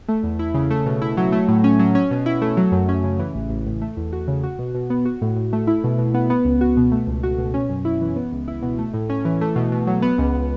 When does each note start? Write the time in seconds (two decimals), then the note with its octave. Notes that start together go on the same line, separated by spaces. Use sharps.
0.08 A3
0.23 E2
0.39 E4
0.54 C#3
0.70 A3
0.86 B2
1.02 E4
1.17 F#3
1.32 A3
1.48 A2
1.64 C#4
1.79 F#3
1.95 C#4
2.11 B2
2.26 E4
2.42 A3
2.57 F#3
2.72 F#2
2.89 C#4
3.04 C#3
3.19 E3
3.35 A1
3.50 A1
3.66 A2
3.82 A3
3.97 E2
4.13 F#4
4.28 C#3
4.43 F#4
4.59 B2
4.75 B2
4.90 B3
5.05 F#4
5.21 A2
5.36 A2
5.53 A3
5.67 E4
5.84 B2
5.98 B2
6.14 B3
6.30 B3
6.45 C#2
6.61 F#4
6.77 B2
6.92 A3
7.07 C#2
7.23 F#4
7.38 B2
7.54 C#4
7.69 F#2
7.85 E4
8.01 E3
8.16 B3
8.32 C#2
8.48 E4
8.62 B2
8.78 A3
8.94 A2
9.10 C#4
9.25 E3
9.41 A3
9.56 B2
9.72 B2
9.87 F#3
10.02 B3
10.18 C#2